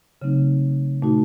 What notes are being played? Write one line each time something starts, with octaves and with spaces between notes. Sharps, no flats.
C#3 F#3 A3 C4 D#4
A#2 A3 D#4 F#4